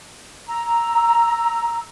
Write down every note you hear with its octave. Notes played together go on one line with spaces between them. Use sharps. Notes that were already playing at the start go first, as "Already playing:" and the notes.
A#5 E6